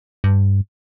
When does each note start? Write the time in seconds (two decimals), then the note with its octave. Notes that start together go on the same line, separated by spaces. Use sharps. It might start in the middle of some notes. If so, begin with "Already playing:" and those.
0.24 G2